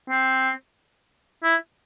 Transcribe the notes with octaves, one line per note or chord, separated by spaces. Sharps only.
C4
E4